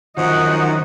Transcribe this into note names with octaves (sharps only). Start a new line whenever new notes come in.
F#2 D#3 F3 D#4 D#5 F#5